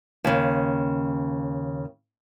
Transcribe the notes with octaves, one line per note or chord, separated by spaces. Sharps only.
D#2 C#3